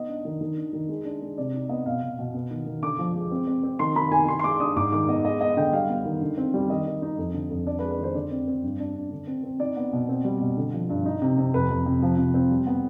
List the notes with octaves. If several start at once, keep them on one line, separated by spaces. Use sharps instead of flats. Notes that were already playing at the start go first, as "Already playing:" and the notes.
Already playing: B3 D#4 D#5
D4
D#3
D#3
D4
D#3
G#3
D4
G#3
C3 D5
D#4
B3 D#5
B2 F5
B2
B2
B3
D#3
D#3
D3 D6
F3
G#3
C4
C4
C4
D#3 C6
D#3 B5
D#3 G#5
D#3 C6
C6
G#3 D6
D4 D#6
G#2 D6
D#3 D6
B3 D#5
G#3 D#5
B3 D#5
D3 G5
G3 F5
B3
D#3
D3
C4
G3
D#3 D#5
D#3
D#4
F2
D3
F2
D4 D5
B4
G#3
B4
D#3 C5
D3 D5
C4
C4
G2
D4
D4
D3
C4
C4
D#4 D5
B3
B2
C4
G3
B2
D3
F3
G2
D#4
C3
C3
F2 B4
F2
C3
F3
C3
C4
G3
B3